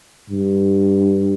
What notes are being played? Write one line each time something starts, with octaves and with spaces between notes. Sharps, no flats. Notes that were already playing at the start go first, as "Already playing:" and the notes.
G2